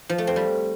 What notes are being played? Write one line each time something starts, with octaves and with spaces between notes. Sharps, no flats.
F3
A3
C4
G3